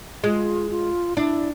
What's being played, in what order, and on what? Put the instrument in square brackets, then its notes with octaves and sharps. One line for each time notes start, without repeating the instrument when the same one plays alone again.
[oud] G#3 [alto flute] F4
[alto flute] F4
[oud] D4 [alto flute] E4